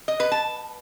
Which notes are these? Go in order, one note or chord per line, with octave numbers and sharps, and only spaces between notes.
D#5
B4
A5